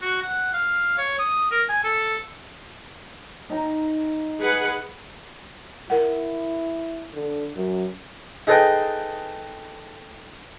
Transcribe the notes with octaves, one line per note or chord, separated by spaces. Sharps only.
F#4
F#5
F5
C#5
D#6
A#4
G#5
A4
D#4 A#5
G#4 B4 F#5
E4 A#4 F#5
D3
F#2
D#4 G#4 A4 B4 D#5 G5